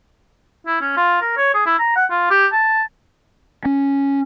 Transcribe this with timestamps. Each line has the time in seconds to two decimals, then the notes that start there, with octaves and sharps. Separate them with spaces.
0.67 E4
0.81 C#4
0.97 F4
1.21 A#4
1.37 C#5
1.54 G#4
1.66 E4
1.79 A#5
1.96 F#5
2.10 F4
2.31 G4
2.52 A5
3.65 C#4